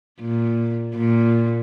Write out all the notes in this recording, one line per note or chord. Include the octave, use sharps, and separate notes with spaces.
A#2
A#2